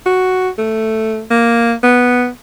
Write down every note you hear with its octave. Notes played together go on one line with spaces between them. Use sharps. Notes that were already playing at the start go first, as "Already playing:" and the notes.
F#4
A3
A#3
B3